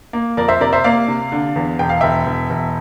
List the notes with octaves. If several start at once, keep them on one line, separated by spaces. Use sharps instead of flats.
A#3
F2 A#4 D5
C5 E5
C3 A#4 D5
C5 E5
A#3 D5 F5
C3
D3
E2
E1 G5
F5
E1 E5 G5
E1
E1